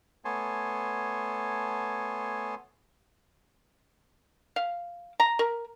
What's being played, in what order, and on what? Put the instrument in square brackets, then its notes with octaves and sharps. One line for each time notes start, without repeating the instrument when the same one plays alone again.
[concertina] A3 B3 C#5 G#5 A5 C6
[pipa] F5
A#5
A#4